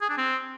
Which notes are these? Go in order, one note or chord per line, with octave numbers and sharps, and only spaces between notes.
G#4
D4
C4